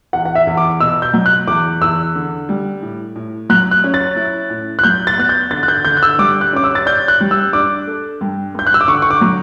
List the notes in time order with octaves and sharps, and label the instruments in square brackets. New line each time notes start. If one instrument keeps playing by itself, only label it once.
[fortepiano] E2 [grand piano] F#5
[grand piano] F#5
E5
[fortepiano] E2
[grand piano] D6
[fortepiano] B2 [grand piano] E6
[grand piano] G6
[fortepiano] F#3
[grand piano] F#6
[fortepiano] E2 [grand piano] D6
[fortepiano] E2 [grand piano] E6
[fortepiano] D3
G3
A2
A2
[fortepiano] F#3 [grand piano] F#6
[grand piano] F#6
[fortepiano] C#4
[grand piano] A6
[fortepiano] E4
A2
[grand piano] F#6
[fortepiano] F#3 [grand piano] G6
[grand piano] A6
[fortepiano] B3 [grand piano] F#6
[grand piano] G6
[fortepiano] D3 [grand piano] A6
[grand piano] F#6
G6
[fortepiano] D3 [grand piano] G6
[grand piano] F#6
E6
[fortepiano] G3 [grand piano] D6
[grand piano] F#6
[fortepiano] C#4 [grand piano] D6
[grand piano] E6
A6
[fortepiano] D5 [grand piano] G6
[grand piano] F#6
[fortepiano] G3
[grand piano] E6
[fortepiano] D4 [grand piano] D6
[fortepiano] A4
G2
[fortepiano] G2 [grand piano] G6
[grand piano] F#6
E6
D6
[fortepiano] D3 [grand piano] C#6
[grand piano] C#6
D6
[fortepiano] F#3